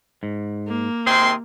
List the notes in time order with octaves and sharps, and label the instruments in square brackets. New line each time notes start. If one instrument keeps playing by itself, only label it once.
[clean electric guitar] G#2
[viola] A#3
[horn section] C3 D#3 C4 [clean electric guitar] G#4 [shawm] C6